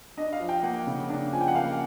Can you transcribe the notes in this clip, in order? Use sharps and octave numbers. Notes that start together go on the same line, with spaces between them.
D4 D#5
F5
F3
G5
A#3 F#5
C#3
D4
F3 G#5
G5
F#5
A#3 F5